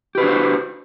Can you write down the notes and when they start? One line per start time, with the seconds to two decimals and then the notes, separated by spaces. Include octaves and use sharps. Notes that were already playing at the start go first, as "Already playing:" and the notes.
0.15 G4
0.18 B4
0.20 F#4
0.23 D4
0.26 C5